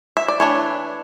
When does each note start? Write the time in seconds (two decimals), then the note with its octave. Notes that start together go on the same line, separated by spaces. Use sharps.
0.17 E5
0.28 D5
0.40 E3 A3 D4 C#5